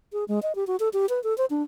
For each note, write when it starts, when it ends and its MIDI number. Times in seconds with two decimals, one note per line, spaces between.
0.13 0.24 68
0.28 0.40 56
0.43 0.55 75
0.55 0.67 67
0.67 0.76 66
0.80 0.89 69
0.93 1.06 67
1.09 1.22 71
1.24 1.36 69
1.38 1.46 72
1.50 1.63 62